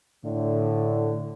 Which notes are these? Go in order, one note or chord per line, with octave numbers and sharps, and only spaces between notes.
A2 D3